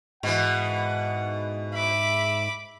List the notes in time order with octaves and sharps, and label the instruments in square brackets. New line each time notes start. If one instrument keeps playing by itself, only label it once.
[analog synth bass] G#2 [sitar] B2 E3 [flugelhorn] F#5
[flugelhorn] E5 [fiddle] B5 D6